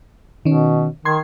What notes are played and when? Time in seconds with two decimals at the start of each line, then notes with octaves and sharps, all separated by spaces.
0.45 B2 D#3 C#4
1.05 D#3 C6 G#6